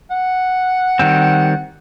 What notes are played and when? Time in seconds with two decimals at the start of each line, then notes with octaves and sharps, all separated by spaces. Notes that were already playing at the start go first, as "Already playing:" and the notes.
0.11 F#5
0.99 D#3 G3 C4